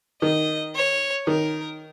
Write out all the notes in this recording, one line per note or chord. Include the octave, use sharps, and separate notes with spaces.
D#3 D#5
C#5
D#3 A#4